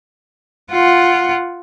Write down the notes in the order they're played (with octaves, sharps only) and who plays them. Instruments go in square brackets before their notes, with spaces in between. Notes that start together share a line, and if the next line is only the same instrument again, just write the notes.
[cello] F4 F#5